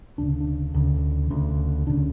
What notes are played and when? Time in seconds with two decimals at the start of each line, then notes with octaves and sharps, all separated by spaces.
0.18 D2 C#3 D4
0.40 D4
0.74 D2 C#3
1.30 D2 C#3
1.87 D2 C#3 D4